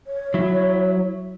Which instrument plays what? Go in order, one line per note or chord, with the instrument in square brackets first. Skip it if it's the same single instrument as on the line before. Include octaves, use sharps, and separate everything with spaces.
[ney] C#5
[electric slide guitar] F#3 E4